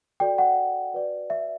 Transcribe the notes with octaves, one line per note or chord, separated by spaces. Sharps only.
F#4 A4 D5 G5
F#5
F#4 B4 D5
E5